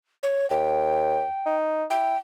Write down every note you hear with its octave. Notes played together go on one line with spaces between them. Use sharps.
C#5
D#2 G5
D#4
E4 G5